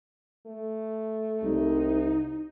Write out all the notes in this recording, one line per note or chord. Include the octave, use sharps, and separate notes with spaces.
A3
C2 D#4